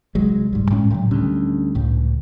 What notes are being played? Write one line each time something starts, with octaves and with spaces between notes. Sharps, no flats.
C2 F#3 G#3
G1 G#2 G3
A2 G#3 C#4
A2 C#3 F#3
D2 G3 C#4
C#2 A2